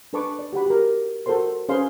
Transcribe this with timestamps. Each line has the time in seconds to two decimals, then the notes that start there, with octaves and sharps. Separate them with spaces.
0.13 D4 A4 B4 A5 C#6 D6
0.39 D5
0.53 F#4 G4 F#5 B5
0.66 G4 A#4
1.26 F#4 A4 A#4 C5 C6
1.69 C#4 G#4 B4 C5 F5 C6